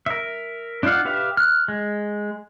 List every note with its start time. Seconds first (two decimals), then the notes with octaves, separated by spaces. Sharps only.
0.06 A#4 E5
0.83 D4 D#4 F4 F5 F#5
1.05 G4 B4 E5 F5
1.37 F6 F#6
1.68 G#3